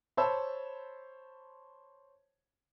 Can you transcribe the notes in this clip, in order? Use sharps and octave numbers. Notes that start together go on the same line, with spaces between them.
C5 C#5 A5 B5 E6